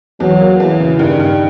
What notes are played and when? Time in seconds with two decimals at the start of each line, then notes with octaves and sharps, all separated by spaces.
0.20 E2 F#3
0.40 A#3
0.60 E2 E3
0.80 C#3
0.99 G2 D#3
1.20 G2